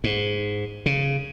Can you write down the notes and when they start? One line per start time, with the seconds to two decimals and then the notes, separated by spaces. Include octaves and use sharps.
0.04 G#2
0.86 C#3